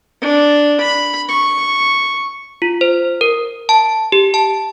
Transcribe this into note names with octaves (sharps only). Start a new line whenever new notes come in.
D4
B5
C#6
F4
C5
A#4
A5
G4
A5